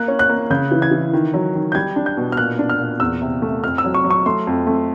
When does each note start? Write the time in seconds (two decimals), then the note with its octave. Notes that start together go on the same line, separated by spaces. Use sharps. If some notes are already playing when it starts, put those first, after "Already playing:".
Already playing: A#3 F#6
0.08 C#4
0.19 F#6
0.29 A#3
0.50 C#3 G6
0.72 E3
0.82 G#6
0.91 E3
1.13 D#3
1.34 F#3
1.55 D#3
1.72 G6
1.75 G3 G#6
1.96 D4
2.06 G6
2.17 B2
2.32 F6
2.37 A#2 F#6
2.59 D4
2.70 F6
2.80 A#2
3.00 E2 E6
3.21 C3
3.42 A3
3.64 F2 F6
3.78 E6
3.84 F#3
3.94 C#6
4.05 F#3
4.11 C#6
4.26 A3 C6
4.47 F2
4.67 A3